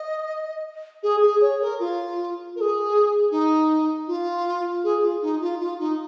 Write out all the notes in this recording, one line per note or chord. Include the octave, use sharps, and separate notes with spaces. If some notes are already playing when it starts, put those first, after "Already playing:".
Already playing: D#5
G#4
G#4
C#5
A#4
F4
A#4
G#4
D#4
F4
G#4
F4
D#4
F4
F4
D#4